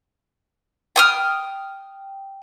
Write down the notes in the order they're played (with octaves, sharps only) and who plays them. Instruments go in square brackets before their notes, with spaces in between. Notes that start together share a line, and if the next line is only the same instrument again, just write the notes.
[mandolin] G5 D#6 F6